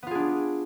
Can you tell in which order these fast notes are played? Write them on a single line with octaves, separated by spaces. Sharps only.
B3 F4 G#4 D4